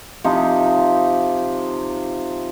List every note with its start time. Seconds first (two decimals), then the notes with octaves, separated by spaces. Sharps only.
0.24 C3 F3 D#4 G4